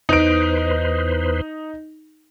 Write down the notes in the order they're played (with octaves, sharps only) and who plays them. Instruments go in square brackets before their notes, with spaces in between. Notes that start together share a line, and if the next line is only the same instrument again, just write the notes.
[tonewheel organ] E2 B4 C5 [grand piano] D#4 D7